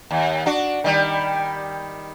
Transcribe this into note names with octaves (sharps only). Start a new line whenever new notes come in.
D#2
D4 F#4
D#3 G3